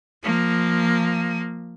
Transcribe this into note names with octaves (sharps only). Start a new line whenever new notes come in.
F3 A#3